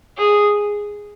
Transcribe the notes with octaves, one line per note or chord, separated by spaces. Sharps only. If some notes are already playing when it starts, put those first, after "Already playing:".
G#4